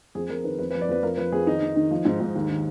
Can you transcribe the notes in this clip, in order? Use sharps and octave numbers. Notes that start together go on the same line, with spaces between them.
F2 G#4
F2 A#4
D#3 B4
F2 B4
B4
F3
D5
F2 B4
F3 A#4
F3 B4
F2 G#4
D#3 D#4
D#3
D#3
F3
G#2
G#2
D#2
D#3